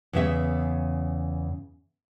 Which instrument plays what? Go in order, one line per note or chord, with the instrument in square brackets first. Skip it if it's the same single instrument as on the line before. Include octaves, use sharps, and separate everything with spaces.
[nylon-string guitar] E2 C#3 E5